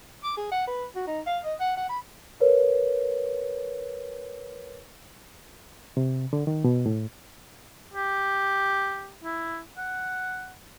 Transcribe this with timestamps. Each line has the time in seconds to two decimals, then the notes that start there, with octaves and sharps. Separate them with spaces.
0.23 D6
0.37 G#4
0.52 F#5
0.67 B4
0.95 F#4
1.07 D#4
1.26 F5
1.44 D#5
1.60 F#5
1.77 F#5
1.89 B5
2.40 A#4 B4 C#5
5.97 C3
6.33 D3
6.47 D#3
6.64 B2
6.86 A2
7.94 G4
9.24 E4
9.77 F#5